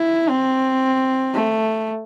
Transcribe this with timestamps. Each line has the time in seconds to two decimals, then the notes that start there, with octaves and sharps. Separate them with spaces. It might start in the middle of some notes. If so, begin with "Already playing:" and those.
Already playing: E4
0.29 C4
1.33 A3